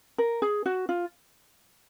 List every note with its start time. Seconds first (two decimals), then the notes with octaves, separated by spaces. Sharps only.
0.18 A#4
0.42 G#4
0.66 F#4
0.89 F4